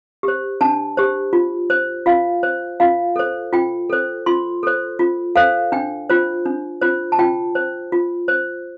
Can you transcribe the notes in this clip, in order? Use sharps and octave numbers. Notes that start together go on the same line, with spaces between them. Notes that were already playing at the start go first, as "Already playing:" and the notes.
G4 C5
D4 A5
G4 C5
F4
C5
F4 F5
C5
F4 F5
A4 C5
F4 G5
A4 C5
F4 C6
A4 C5
F4
A4 C5 F5
D4 G5
F4 C5
D4
F4 C5
A5
F4 G5
C5
F4
C5